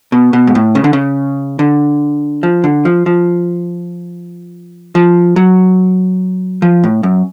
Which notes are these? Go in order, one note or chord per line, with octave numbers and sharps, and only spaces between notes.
B2
B2
G#2
A2
C#3
D3
C#3
D3
F3
D3
F3
F3
F3
F#3
F3
A2
F#2